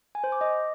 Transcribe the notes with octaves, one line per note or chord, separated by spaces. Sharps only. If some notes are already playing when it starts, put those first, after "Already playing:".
G#5
C5
D6
D#5